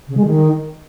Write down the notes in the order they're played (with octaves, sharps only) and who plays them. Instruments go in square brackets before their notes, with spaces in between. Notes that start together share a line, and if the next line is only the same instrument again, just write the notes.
[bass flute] C#3
G#3
D#3